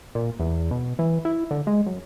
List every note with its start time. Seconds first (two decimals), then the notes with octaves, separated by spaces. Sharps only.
0.15 A#2
0.40 E2
0.71 B2
0.99 E3
1.25 E4
1.51 D3
1.67 G#3
1.86 F#2